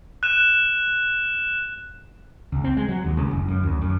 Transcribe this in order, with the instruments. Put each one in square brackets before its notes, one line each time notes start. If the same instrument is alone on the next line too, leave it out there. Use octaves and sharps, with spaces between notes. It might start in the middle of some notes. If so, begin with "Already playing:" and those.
[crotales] F#6 E7
[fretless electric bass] C#2
C4
G#3
F#3
D#2
C#2
F#1
F#2
D2
F#2